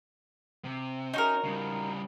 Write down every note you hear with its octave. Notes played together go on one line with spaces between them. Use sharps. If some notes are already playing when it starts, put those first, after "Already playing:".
C3
C#4 D#4 F#4 A#4
C#3 G3